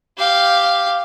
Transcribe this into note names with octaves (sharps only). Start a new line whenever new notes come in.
G4 F5